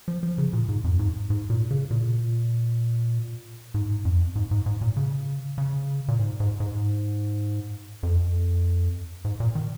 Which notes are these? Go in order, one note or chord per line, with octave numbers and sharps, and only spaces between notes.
F3
F3
C#3
A#2
G#2
F2
G#2
G#2
A#2
C#3
A#2
G#2
F2
G#2
G#2
G#2
A#2
C#3
C#3
A#2
G#2
G#2
G#2
F2
G#2
A#2
D#3